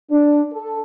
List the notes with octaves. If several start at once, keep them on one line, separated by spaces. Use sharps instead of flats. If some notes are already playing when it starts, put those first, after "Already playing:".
D4
A4